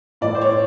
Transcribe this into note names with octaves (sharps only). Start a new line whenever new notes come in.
A2 E3 D5
C5
C#5